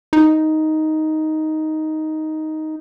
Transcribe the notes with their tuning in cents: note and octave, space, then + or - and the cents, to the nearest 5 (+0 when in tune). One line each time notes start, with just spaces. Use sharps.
D#4 +5